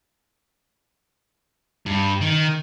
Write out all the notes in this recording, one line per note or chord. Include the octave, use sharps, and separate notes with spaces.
G2
D#3